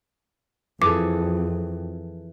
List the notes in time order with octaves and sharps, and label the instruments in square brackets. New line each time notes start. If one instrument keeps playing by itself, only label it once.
[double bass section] F2 [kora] E3 G#4 A4 [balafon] D6